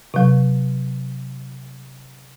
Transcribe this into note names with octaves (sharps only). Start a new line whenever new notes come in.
C3 F#3